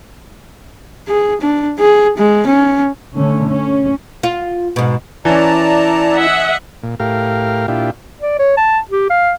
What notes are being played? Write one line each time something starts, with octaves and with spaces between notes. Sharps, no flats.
G#4
D4
G#4
G#3
C#4
D3 A3 C#4
C#4
F4
G#2 B2
E3 C#4 E4 D5 A5 A#5
D#5 E5 F#5
A#2
A2 G4 A#4 F5
A#2 D4 E4 F4 G4
D5
C#5
A5
G4
F5